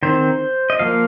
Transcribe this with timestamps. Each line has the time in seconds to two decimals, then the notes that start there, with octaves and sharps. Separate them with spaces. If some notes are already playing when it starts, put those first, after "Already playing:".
0.03 D#3 C4 C5
0.70 D#5
0.79 F3 A#3 F5